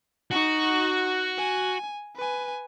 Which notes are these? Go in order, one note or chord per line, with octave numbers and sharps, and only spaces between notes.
D#4 F#4 C#6
G#5
B4 G#5